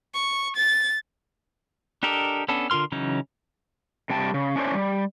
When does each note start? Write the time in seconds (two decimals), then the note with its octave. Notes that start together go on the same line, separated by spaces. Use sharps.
0.14 C#6
0.56 A6
2.03 D4 G4 A4 A#4 D#5
2.49 B3 C#4 D4 A4
2.70 D3 F4 A#4 C6 F6
2.92 C#3 E3 F#3 C#4 D#4
4.10 C3 G3 G5 A5
4.34 C#3
4.56 C#4 D4 E4 C5 C#5
4.74 G3